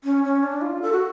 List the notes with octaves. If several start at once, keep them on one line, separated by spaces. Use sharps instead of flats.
C#4
C#4
D4
F4
A4
F#4